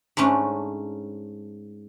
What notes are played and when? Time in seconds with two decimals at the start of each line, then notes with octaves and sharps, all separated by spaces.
0.17 G#2 A3 C#4 D4